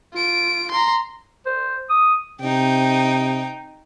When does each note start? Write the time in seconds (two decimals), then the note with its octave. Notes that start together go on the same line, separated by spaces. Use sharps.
0.13 F4 D7
0.71 A#5 C6
1.46 C5
1.90 D#6
2.41 C3 D#4 G5